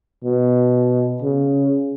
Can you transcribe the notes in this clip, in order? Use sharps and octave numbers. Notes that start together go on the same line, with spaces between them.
B2
C#3